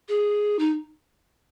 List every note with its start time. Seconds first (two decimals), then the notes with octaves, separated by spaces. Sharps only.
0.08 G#4
0.59 D#4